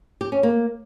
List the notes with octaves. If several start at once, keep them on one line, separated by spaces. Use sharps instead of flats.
G4
C#4
A#3